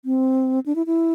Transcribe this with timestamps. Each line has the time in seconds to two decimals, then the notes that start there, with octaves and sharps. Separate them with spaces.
0.05 C4
0.66 D4
0.76 E4
0.86 E4